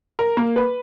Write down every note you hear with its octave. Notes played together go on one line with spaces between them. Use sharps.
A#4
A#3
B4